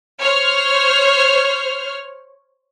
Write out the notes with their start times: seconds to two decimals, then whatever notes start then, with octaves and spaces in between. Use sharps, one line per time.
0.20 C5 C#5 F6